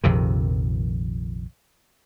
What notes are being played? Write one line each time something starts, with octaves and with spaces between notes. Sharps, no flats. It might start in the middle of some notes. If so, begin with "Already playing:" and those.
A#1 F2 C3 D#3